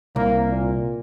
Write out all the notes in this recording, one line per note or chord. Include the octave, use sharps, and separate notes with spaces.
C2 A#3
A#2